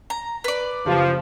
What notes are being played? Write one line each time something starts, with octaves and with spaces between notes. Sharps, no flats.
A#5
B4 D5
F#1 F3 G4 F5